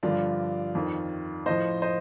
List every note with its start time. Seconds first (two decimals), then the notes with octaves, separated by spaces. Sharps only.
0.03 G2 D3 F3 D4 F4
0.75 F2 D#3
1.46 A2 F3 C5 D#5
1.82 C5 D#5